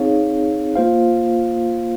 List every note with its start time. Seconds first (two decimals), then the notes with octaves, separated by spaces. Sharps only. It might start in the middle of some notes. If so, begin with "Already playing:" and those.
Already playing: C4 D#4 G#4 C#5 F5
0.76 A#3 F4 C5 F5